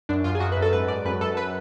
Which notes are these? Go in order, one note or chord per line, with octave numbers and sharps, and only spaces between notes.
F#2 D4
F#2 F4
G#4
F#2 F#4
B4
F#2
A4
G#2 B4
G#2 D5
F#2 B4
F#2 A4
B4